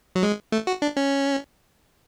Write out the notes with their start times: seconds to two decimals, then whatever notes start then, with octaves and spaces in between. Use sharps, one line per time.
0.15 F#3
0.23 G#3
0.52 A3
0.67 F#4
0.82 D4
0.97 C#4